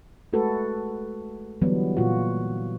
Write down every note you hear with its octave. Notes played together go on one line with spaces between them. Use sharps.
G#3 A3 F#4 A4 B4
D3 E3 F#3 G3 B3
A#2 F4 F#4